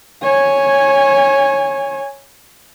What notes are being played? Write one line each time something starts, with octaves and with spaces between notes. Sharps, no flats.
C#5 G#5